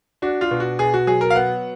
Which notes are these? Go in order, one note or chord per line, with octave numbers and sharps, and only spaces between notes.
D4 F#4
F4
B2
F#4
B2 G#4
F#4
F#3 G#4
A#4
F5
B3 F#5